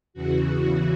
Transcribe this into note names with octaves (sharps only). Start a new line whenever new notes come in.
E2 C#3 E3 F#4